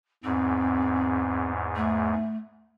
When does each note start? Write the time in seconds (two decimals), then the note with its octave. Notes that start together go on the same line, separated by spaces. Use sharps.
0.24 E2 G#2 C4
1.76 A3